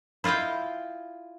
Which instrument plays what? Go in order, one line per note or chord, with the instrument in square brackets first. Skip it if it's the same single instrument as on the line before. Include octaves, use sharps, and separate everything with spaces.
[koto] E4 F4 D#5 F5 G5